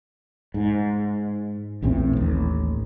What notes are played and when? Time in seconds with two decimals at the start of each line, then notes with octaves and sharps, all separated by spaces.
0.54 G#2
1.82 A#1 E2 A2 C4
2.17 A1 D#2